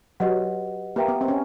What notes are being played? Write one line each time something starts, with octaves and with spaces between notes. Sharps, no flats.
F#3 G4 B4 D#5 F#5
A#3 G4 B4 E5 G5 A#5
B3
C4
C#4